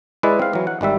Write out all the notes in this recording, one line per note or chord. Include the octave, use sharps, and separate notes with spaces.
G#3 E4 B4 D5 D#5
C4 F5
E3 F#3
F#5
G#1 D#3 G3 E5